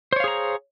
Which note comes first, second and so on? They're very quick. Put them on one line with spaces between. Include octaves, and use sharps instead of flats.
C5 C#5 F5 G#4 A#5